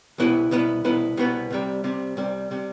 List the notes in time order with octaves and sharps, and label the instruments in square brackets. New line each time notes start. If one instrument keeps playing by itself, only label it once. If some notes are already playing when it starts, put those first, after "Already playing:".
[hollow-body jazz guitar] C2 B2 B3 E4 B4
C2 B2 B3 E4 B4
C2 B2 B3 E4 B4
C2 B2 B3 E4 B4
C2 C3 G3
C2 C3 G3
C2 C3 G3
C3 G3